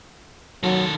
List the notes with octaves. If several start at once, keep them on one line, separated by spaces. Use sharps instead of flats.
D#3 F#3 A4